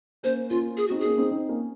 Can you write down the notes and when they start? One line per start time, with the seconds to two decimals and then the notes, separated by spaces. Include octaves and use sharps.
0.23 A#3 C#4 C5
0.50 A#3 C#4 F4
0.77 G#4
0.88 C4 D#4 F#4
1.00 A#3 C#4 G#4
1.18 C4 D#4
1.31 C4 D#4
1.49 A#3 C#4